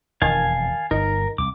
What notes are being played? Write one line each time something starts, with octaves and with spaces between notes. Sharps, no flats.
E1 F2 D#3 F5 G#5 A5
G1 D#4 A#4
C2 D6